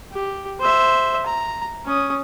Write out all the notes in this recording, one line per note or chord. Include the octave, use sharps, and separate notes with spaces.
G4
C5 E5
A#5
C#4 D#6